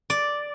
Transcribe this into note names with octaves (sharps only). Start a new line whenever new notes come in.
D5